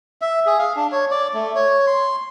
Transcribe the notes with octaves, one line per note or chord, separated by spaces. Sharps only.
E5
G#4
F5
D4
C#5
D5
A3
C#5
C6